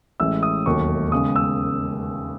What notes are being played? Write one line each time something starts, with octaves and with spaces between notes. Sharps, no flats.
A1 A2 E3 G#3 E6
D#6
E1 D#2 D#3 F#3 A3 C#6
E2 C#3 G#3 D#6
E6